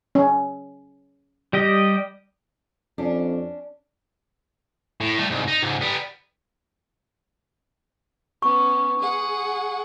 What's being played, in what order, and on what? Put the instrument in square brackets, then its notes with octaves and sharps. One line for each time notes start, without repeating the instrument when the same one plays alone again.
[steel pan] C#4
[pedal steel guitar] G3 G4 D#5
[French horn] F2 [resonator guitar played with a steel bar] C#4 D4
[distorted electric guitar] A2
G3 A3
C2 G#2
D#4
C#2 G#2
G3 B3
[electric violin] B3 C#4 [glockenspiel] C#6
[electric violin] G#4 F#5